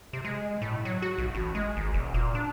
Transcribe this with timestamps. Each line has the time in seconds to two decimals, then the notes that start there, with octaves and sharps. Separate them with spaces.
0.13 C3
0.25 G#3
0.62 A2
0.85 F#3
1.02 F#4
1.18 B1
1.35 A1
1.55 G#3
1.77 G#1
1.94 E1
2.14 A#2
2.35 D4